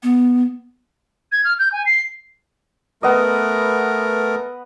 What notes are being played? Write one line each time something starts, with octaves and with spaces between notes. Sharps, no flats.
B3
G#6
F6
G6
G#5
C7
A3 B3 A#4 D#5